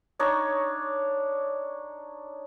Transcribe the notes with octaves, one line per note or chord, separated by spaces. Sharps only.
D4 D#4 C#5